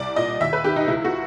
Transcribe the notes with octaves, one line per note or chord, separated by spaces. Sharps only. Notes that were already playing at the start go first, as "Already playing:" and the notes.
Already playing: C2 D5
A#2 D#5
D#2 E5
B4
D#3 G4
D#4
C#2 E4
F#4